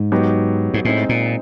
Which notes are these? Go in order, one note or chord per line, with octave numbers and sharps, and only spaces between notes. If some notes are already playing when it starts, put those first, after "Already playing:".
Already playing: G#2
F#3 B3 D#4 G4
G#2
A2 G#3 C4 D#4
A#2